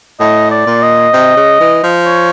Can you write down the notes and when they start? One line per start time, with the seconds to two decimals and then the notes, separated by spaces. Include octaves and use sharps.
0.20 A2 D#5
0.51 D5
0.66 A#2
0.82 D#5
1.13 C3
1.37 C#3
1.60 E3
1.84 F3
2.06 C#5